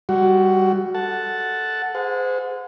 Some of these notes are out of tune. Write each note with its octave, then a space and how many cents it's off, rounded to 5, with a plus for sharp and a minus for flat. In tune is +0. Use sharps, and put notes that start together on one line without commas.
G3 +0 F#4 +15
A4 +0 F#5 +0 A5 +0
G#4 +0 C5 -30 F#5 -35